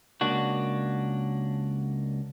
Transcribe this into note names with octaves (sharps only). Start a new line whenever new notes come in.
C#2 A#3 D4 F#4